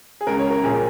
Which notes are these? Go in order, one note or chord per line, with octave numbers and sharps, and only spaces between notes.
G#4
C#2 C#3 A#4
C#5
A#4
A#1 A#2 G#4